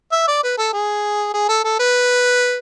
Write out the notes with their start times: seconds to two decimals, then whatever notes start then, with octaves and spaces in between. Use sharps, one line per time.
0.12 E5
0.27 D5
0.43 B4
0.58 A4
0.73 G#4
1.34 G#4
1.48 A4
1.64 A4
1.79 B4